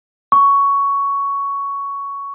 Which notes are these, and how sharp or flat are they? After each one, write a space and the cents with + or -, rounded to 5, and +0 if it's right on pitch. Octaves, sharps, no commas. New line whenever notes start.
C#6 +10